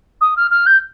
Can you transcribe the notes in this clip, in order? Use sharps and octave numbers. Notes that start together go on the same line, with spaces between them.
D#6
F6
F6
G6